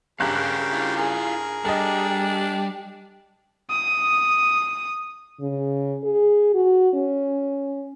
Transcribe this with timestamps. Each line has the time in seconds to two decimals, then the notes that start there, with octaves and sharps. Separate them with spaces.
0.20 G2 C#3 G4 A4 A#4 E5 F5 F#6
0.73 E4 F4
0.96 G#4 A#4
1.65 G3 D4 A4 D#5
3.70 D#6
5.40 C#3
6.04 G#4
6.54 F#4
6.94 C#4